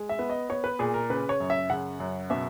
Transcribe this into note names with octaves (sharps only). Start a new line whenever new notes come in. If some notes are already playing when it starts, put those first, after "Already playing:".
Already playing: G#3
E5
B3
D#5
B3 C#5
B4
A#2 G#4
A#4
C#3 B4
C#5
F#2
E5
C#3 F#5
F#2
B2 E5